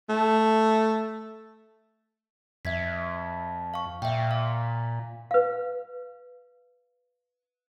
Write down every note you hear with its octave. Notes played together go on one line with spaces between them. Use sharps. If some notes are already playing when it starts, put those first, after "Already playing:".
A3
F2 E5 G#6 B6
F5 C#6
A#2 E5 G5
F5
B4 F5